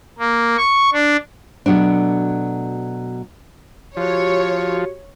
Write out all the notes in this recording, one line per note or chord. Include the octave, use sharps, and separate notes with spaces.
A#3
C#6
D4
B2 F#3 A3 D4
F3 F#4 G4 C#5